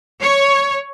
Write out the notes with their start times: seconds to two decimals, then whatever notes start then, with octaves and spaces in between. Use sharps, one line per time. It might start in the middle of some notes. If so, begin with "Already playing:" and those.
0.22 C#5